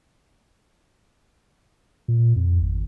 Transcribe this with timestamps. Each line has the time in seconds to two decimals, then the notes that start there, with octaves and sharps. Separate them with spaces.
2.08 A#2
2.36 F2
2.61 G#1